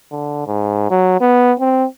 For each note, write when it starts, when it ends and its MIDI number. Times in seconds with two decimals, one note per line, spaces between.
0.12 0.45 50
0.47 0.88 44
0.90 1.18 54
1.21 1.53 59
1.60 1.85 60